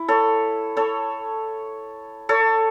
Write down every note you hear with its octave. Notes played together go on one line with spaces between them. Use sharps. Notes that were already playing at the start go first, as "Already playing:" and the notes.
Already playing: E4
A4 C#5
A4 C#5
A4 C#5